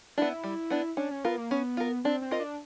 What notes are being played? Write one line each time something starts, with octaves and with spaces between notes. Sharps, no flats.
B3 D4 E4
G3
B3 D4
C#4 D4
C#4
B3 F4 A#4
A#3
B3 C#4
F4 A#4
C4 D4
C4
F4 A#4 D#5
D4